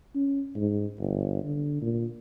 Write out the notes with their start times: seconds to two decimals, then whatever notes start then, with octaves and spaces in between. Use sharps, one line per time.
0.15 C#4
0.56 G#2
0.99 G1
1.44 D3
1.82 A#2